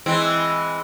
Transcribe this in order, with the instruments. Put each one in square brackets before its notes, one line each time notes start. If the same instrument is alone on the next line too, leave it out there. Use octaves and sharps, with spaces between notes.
[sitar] E3 G#3 C4